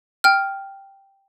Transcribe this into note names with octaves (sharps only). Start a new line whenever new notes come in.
G5 F6